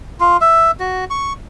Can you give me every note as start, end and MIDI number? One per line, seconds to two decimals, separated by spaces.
0.20 0.37 65
0.41 0.71 76
0.80 1.05 66
1.10 1.33 85